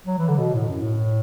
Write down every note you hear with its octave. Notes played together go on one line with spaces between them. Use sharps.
F#3
E3
D3
B2
A2
F#2
A2